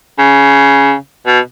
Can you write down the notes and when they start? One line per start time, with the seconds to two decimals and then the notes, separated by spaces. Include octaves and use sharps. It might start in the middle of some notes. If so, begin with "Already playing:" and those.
0.19 C#3
1.26 B2